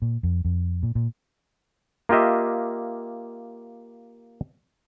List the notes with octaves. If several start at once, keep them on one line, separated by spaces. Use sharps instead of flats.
A#2
F2
F2
A#2
A#2
A#3 F4 G4 D#5 E5